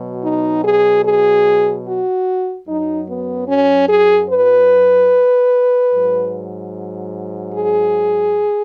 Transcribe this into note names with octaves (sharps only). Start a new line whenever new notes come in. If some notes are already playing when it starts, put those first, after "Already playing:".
Already playing: B2 F#3
D#4
G#4
G#4
F#4
F#2 F#3 D#4
B3
C#4
G#4
B4
G#2 F#3
G#4